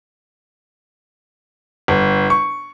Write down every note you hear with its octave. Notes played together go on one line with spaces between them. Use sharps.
G1
C#6